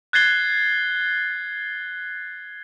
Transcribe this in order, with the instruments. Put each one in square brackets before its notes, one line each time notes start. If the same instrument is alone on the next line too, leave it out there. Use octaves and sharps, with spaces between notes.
[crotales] F#6 G#6 A6 C7 G7